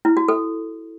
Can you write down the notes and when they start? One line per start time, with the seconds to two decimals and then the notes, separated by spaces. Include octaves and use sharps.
0.05 E4
0.17 F#4
0.28 A4